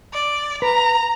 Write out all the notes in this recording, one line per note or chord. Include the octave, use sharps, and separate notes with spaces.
D5
B4 A#5